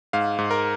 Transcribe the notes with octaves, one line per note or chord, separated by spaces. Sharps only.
G#2 F5
G#2
A#4